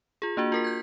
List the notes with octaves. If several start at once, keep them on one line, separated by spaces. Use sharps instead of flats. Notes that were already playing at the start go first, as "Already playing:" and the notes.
F4 G#4
A#3 D4 F#4
F4 A#4 B6
G6 G#6